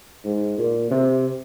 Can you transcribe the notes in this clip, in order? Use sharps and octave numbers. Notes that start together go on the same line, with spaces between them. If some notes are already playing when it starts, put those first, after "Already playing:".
G#2
A#2
C3